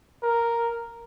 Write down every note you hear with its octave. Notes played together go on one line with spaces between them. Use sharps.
A#4